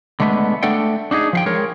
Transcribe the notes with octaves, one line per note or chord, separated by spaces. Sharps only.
D3 G#3 A3 B3
A3 D4 A4 D5 F#5 G5
D4 D#4 F#4 G#4
F3 F5 G5
G#3 A#4 C#5